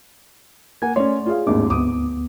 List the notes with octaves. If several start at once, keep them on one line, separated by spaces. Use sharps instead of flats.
A#3 F#5 G#5 G#6
A3 C#4 C#5 D5 C6
F4 G#4 F5
G#1 D#2 A2 D4 G#4 D6
D2 B3 D6 D#6